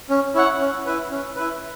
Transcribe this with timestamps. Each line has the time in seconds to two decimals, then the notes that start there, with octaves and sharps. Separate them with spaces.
0.10 C#4
0.35 E4 C#5 F#5
0.60 C#4
0.86 E4 B4
1.11 C#4
1.36 E4 B4